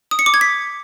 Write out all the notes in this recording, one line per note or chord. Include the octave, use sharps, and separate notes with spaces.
D#6
C#7
D6
G#6
B6